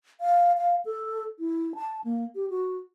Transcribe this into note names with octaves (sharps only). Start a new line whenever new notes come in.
F5
F5
A4
E4
A5
A#3
G4
F#4